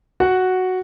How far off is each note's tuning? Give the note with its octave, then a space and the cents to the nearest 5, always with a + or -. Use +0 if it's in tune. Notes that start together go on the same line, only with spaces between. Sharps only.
F#4 +0 F#5 +0